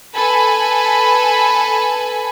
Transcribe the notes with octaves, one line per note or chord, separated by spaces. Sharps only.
A4 B4 G#5 B5